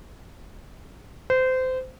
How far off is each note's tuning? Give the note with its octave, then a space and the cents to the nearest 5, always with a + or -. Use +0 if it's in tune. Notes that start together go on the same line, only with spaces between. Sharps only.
C5 -25